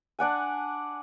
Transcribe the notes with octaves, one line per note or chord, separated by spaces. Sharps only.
D4 D5 F#5 G#5